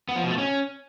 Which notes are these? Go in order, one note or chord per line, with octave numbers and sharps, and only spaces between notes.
B3
F3
B2
A3
C#4